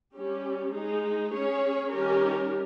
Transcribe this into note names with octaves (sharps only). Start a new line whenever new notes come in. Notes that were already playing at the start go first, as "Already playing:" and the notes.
G3 C#4 G4
G#3 D#4 G#4
C#4 G#4 C#5
D#3 G3 C#4 G4 A#4